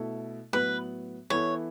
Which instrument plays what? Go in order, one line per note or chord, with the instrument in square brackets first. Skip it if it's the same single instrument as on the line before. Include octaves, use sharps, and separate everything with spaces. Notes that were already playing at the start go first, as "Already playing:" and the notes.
Already playing: [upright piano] B2 A3 E4 A4
[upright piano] A2 F#3 B3 [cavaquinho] B4
[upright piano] E3 B3 E4 A4 [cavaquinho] C#5